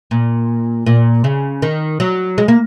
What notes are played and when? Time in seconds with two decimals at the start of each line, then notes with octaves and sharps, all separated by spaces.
0.11 A#2
0.86 A#2
1.24 C#3
1.62 D#3
2.00 F#3
2.38 G#3
2.48 A#3